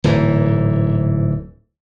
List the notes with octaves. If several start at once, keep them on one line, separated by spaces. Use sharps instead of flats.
D1 G#2 E3